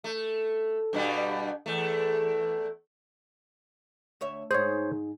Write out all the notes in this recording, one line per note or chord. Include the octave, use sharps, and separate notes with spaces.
A3
G2 B2 G3
E2 A3
D2 C#5 E5
G#2 D#4 G#4 C5 C#5